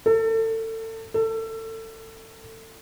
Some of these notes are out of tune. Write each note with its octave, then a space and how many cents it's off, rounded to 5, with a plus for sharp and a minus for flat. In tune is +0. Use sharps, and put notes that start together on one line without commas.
A4 +30
A4 +25